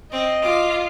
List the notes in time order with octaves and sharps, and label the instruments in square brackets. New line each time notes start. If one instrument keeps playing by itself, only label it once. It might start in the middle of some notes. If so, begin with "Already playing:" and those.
[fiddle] C4 [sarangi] D#5
[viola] F4 [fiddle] D6